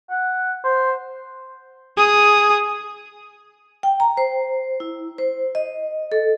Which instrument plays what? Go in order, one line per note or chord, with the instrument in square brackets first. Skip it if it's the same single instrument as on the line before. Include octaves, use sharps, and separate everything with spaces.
[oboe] F#5
C5
[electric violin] G#4 D#6
[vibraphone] G5
A#5
C5
E4
C5
D#5
A4